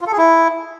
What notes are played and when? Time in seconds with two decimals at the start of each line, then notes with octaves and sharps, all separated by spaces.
0.01 F4
0.07 A4
0.12 G#4
0.18 E4